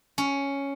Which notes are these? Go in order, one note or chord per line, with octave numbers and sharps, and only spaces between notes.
C#4